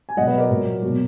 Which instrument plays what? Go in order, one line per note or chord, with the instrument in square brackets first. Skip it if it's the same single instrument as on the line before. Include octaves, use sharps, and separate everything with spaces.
[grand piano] G#5
B2 F#3 D#5 F#5
B4 D#5
A#4 D5
A#2 F#3
B2 F#3